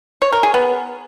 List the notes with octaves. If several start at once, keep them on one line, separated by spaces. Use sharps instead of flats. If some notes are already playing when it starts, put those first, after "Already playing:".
C#5
A#4
G#4
B3